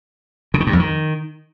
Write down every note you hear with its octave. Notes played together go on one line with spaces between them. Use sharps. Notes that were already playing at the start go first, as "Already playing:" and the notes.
C#3
D#3
G2
F2
D#3